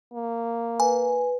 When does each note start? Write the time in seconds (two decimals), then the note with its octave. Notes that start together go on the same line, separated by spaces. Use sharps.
0.13 A#3
0.80 B4 G#5